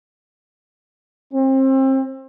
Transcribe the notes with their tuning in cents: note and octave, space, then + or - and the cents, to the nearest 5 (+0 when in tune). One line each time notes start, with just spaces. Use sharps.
C4 +30